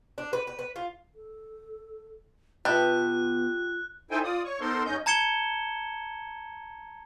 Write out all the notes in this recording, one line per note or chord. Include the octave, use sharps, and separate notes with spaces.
D4
B4
B4
B4
F4
A4
B2 B3 F4 G4 A4 E5 F#6
D#4 E4 A4 C5 G5 G#5
F4 D5 D#6
C#5 C#6
B3 D#4 A4 A#4 C5 C6
G2 C#4 D#4 D#5 G6
A5 A#5 G#6 C#7 E7 G7